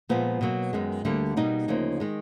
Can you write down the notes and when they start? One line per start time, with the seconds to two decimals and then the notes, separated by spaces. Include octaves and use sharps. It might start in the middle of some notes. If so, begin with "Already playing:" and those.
0.09 A#2 F3 G#3 B3
0.41 B2 F#3 A#3
0.73 F#2 D#3 G#3
1.05 D2 D3 G3 A#3
1.37 B2 G3 A#3 D#4
1.68 D2 C#3 F3 A#3
2.00 D#3 G#3